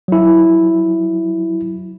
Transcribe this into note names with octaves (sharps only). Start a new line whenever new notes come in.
F#3 E4